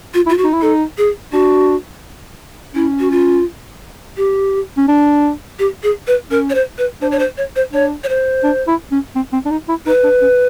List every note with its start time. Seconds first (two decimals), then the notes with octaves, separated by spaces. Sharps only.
0.14 F4
0.26 E4
0.29 F4
0.38 F#4
0.44 D#4
0.53 E4
0.62 D#4 A4
0.98 G#4
1.33 D4 F#4
2.75 C#4 E4
3.00 F#4
3.11 F4
4.17 G4
4.77 C#4
4.88 D4
5.59 G4
5.83 G#4
6.07 B4
6.31 C#4 A#4
6.50 C#5
6.55 C5
6.78 B4
7.02 D4 C5
7.11 C#5
7.19 C5
7.38 C#5
7.56 C5
7.73 D4 C#5
8.04 C#5
8.09 C5
8.44 D4
8.68 E4
8.92 C#4
9.16 C4
9.33 C4
9.46 D4
9.51 D#4
9.69 E4
9.86 D#4 B4
10.04 D4
10.22 C#4